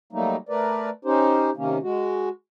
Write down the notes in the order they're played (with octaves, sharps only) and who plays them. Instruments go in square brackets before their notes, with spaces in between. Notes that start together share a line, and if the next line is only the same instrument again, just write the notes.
[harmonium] F#3 G3 A3 A#3 D#4
A3 A#4 B4 D5
C#4 D#4 G4 C5
C3 D#3 A#3 C#4
G#3 F#4